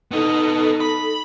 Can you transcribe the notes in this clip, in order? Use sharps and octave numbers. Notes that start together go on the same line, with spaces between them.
B3 D#4 A4 D#5
B5